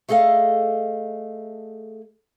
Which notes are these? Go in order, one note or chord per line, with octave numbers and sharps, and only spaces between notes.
A3 G#4 A4 D#5 F5